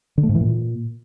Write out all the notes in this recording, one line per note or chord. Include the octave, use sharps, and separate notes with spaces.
D3
A3
G#2
E3
A#2